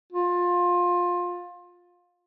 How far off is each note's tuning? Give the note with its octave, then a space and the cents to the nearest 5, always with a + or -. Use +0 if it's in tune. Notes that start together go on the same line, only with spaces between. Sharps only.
F4 +20